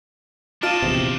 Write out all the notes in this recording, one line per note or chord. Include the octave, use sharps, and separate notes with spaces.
D4 F4 D#5 A5 D6 D7 E7
A#1 E2 C3